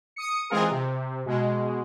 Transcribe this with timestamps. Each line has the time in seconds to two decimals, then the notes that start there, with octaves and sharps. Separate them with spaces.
0.16 D#6 C#7
0.50 E3 G#3 C4 F4 G#4 A#4
0.71 C3
1.26 B2 G#3